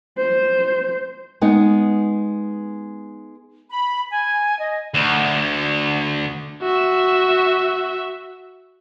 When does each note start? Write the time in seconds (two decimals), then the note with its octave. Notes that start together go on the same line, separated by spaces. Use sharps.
0.18 C5
1.41 G#3 B3 D#4
3.70 B5
4.11 G#5
4.58 D#5
4.94 D2
6.62 F#4 E5